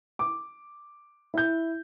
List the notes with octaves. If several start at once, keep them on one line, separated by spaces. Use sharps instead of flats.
D6
E4 G6